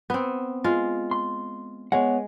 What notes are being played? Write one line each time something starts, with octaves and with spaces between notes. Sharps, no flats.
B3 C4
G#3 F4
C6
G#3 B3 C#5 F#5